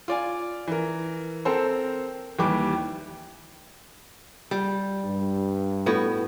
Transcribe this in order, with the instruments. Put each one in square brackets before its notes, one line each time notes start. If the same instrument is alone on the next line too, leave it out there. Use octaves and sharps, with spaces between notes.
[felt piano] F4 D5 G#5
E3 A#4
C4 A4 A#4 C5
D#2 E3 G3 B4 D6
[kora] G3
[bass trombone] G2
[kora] A2 B3 F#4